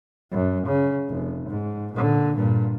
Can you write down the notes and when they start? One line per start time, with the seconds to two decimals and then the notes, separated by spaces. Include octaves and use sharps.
0.31 F#2
0.66 C#3
1.09 F1
1.48 G#2
1.92 A#2 D3
2.35 G2 A#2